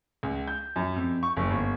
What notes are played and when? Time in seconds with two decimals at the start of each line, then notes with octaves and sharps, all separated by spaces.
0.23 C#2
0.48 G6
0.76 F#2
0.96 F2
1.23 C#6
1.37 F#1
1.51 G1